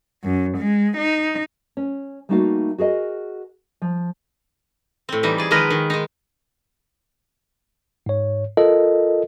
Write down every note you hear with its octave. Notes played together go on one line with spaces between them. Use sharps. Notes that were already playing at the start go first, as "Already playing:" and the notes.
F#2
G#3
D#4
C#4
G3 A3 A#3 D#4 F#4 F5
F#4 G#4 A#4 D#5
F3
A2 C4
E3 G3 D#4
G#4 D5
D#3 F3 G#3 A#4 B4 D#5
D#3
G#3 D#4
G#2 C#5
F4 A4 A#4 D#5